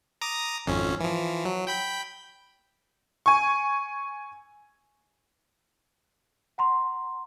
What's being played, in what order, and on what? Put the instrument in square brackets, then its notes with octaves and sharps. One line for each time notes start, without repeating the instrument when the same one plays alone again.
[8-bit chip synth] A#5 D6 D#6
G#1 F2 C#4
E3 F3
F#3
G5 B5 G6
[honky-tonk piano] G#5 C#6
[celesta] F#5 A#5 C6